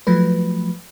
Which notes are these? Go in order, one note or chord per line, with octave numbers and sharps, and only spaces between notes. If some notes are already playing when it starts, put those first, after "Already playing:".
F3 F#3 A3 B4